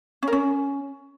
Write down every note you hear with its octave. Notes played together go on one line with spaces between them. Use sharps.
C#4
A#4
C#4